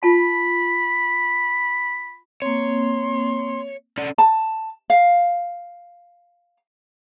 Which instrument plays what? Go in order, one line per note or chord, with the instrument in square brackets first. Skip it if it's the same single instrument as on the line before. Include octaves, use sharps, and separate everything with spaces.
[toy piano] F4 A5 [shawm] B5
[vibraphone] A#3 C4 [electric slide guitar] C#5 [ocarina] C6
[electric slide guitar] C#4 A4 D5
[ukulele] A5
F5